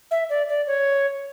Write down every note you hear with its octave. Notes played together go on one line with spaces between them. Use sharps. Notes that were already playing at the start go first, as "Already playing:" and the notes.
E5
D5
D5
C#5